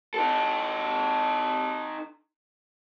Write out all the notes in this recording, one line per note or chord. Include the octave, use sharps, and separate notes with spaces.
D#4 A4